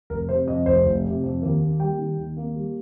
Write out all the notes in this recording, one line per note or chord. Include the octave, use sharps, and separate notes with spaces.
F1 A#4
C3 C5
F2 D#5
F1 C5
F1
C3
F2
D#2 A#4
A#3
G3 G5
D#3
D#2
A#3
G3